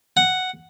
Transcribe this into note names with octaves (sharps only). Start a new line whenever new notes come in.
F#5